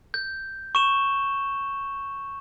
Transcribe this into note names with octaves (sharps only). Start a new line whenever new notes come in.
G6
C#6 E7 G7